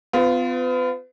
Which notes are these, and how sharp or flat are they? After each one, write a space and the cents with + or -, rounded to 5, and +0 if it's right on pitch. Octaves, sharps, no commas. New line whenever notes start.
B3 +40 F4 -5